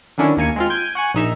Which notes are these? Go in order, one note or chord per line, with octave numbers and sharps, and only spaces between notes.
D3 D#3 F#3 C#4 D4 E4
D#2 A#3 G#5 C#7
G#3 C4 F4
G6 G#6 D7 D#7
F#4 F#5 G#5
A#1 D#4 E5